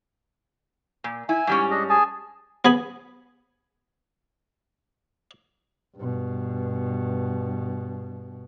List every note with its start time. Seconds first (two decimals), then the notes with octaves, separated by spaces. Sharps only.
1.04 A#2
1.29 E4 G#5
1.47 G#2 G3 C#4
1.71 D4 G#4 D#5
1.89 G#4 G#5 A5
2.65 B3 G#4 G#5 B5
5.97 G2 B2